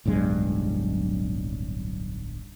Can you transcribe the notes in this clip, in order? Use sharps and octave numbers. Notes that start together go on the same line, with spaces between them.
D1 B1 G2 G#3